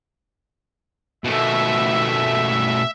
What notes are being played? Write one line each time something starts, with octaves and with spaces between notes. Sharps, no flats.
B2 A3 E5